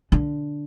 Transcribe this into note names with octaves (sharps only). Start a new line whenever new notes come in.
D3